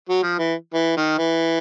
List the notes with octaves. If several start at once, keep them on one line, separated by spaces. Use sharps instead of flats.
F#3
F3
E3
E3
D#3
E3